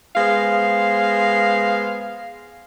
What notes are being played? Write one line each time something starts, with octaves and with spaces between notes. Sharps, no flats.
G#3 B3 C5 F5